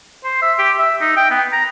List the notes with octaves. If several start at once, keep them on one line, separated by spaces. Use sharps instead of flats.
C5
E5
G4
E5
D#4
G5
B3
A#5